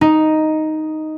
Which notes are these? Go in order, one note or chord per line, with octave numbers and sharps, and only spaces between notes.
D#4